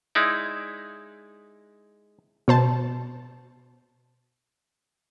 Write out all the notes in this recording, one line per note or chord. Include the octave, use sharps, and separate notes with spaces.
G#3 D#4 E4 D5
B2 C5 A5